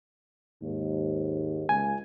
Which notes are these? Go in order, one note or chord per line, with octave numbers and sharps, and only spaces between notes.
D#2 G#2
C#2 G#5